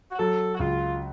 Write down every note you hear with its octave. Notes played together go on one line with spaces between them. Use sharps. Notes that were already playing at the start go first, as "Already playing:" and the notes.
F#4
F#3 A4
F#4
C#2 F4